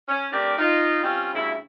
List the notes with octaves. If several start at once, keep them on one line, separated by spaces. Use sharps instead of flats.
C#4
A3 C4 D4 G4 A#4 D5
D#4 F4
G3 C4 C#4 F4
D2 G2 C#3 E4